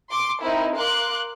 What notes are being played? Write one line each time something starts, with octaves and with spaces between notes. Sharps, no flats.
C6 D6
C4 D#4 E4 A#4
A#4 F5 C6 D6 F#6